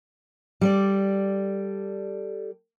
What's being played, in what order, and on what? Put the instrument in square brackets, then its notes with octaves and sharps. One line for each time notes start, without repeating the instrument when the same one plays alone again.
[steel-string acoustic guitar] G3 A4 D5